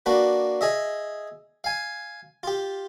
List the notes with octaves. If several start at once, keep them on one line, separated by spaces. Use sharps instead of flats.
A#3 D4 F#4 B4
G#4 D#5 E5
F5 G#5
F4 G4